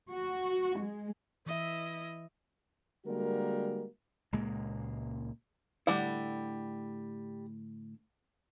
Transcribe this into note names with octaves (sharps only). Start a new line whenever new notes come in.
F#4
G#3
E3 E4 D#5 E5
D3 G3 G#3 A#3 F#4 A#4
C#2 A#2 G#3 A#3
A2 D3 G3 E4 F#5